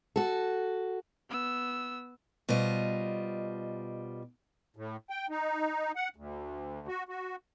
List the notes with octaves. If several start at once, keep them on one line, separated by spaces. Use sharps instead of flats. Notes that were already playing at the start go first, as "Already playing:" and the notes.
F#4 A4
B3 E6
B2 G3 F4 C5 D#5
A2
G5
D#4
F#5
D2
F#4
F#4